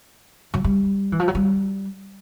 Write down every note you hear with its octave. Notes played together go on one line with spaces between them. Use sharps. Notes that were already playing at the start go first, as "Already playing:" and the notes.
F#3
G3
E3
F3
F#3
G3